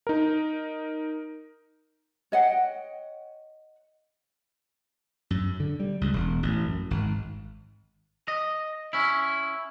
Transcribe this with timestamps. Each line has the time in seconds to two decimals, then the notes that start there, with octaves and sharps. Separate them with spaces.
0.07 D#4 A#4
2.32 C#5 D#5 F#5 G5
5.30 F#2
5.60 D3
5.80 G3
6.01 C#2
6.13 E1
6.43 A1
6.66 F#2
6.91 G#1
8.28 D#5
8.93 C#4 E4